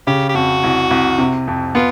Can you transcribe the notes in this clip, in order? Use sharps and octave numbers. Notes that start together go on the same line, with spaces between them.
C#3 G4
G4
F2 F#4
C2
C2
C3
F2
B3 F4